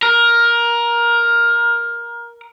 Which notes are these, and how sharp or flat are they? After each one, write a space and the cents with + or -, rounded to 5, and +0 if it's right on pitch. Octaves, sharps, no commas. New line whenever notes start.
A#4 +15